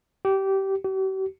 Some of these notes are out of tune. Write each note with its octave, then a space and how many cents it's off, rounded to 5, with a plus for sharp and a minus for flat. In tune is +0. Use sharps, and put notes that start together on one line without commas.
G4 -20
G4 -45